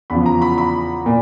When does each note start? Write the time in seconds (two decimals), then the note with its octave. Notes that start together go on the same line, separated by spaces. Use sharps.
0.10 E2 C#3 F3 B5
0.26 A#5
0.42 B5
0.58 B5
1.06 A#2